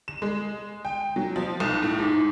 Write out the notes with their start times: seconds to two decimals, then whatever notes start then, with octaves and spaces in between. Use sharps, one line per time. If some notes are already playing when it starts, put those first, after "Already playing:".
0.08 E7
0.22 G#3
0.85 G5
1.16 F#3
1.36 F3
1.60 B1
1.83 A2
1.98 G#2